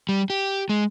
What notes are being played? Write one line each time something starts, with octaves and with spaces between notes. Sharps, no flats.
G3
G4
G#3